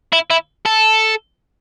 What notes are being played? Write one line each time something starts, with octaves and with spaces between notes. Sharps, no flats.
E4
E4
A4